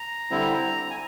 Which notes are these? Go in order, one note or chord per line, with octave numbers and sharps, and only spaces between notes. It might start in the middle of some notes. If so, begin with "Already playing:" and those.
Already playing: A#5
D3 G3 C4 E4
G#5